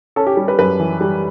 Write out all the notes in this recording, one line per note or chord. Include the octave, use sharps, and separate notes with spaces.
C#4 A4
G4
G3
B4
F#2 B4
E3
G3